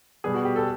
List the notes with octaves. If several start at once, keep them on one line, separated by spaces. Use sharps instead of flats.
B2 G3 B3 G#4
F#4
G4
A4